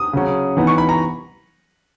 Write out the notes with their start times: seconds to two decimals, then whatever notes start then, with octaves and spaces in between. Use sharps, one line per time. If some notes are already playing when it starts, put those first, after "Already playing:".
Already playing: D#6
0.13 C#3 F#3 C#4
0.57 E3 B3 D#4
0.67 C#6
0.78 B5
0.89 A#5